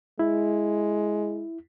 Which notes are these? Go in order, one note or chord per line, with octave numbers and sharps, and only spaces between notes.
G#3 E4